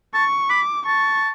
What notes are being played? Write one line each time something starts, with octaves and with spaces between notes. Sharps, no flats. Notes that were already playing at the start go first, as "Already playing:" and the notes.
A5 C#6
B5 D6
A5 C#6